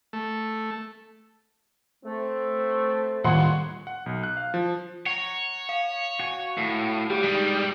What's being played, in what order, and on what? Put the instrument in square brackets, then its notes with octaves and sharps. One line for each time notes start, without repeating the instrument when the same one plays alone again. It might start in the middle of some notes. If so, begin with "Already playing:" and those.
[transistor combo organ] A3
[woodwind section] A3 [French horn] C4
[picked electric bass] A2 D#3 G3 [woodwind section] F4 G4 C#5 [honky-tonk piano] F#5 C6
[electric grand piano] F#5
B1
F#6
F5
F3
[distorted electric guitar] C#5 [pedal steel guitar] F#5 A#5
[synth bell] F5
[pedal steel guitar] F#4 F#5 G#5
[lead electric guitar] A2
[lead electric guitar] G3 [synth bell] G4
[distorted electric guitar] G2 B2 [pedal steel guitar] G#3 D#4